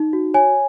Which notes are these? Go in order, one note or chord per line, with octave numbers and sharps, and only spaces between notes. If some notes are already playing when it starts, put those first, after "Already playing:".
Already playing: D#4
F#4
C#5 G#5